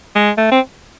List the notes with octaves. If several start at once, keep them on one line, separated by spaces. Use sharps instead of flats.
G#3
A3
C4